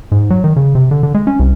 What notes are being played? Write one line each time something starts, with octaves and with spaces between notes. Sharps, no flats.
G#2
F#3
D#3
C#3
C3
D3
D3
G#3
C#4
C2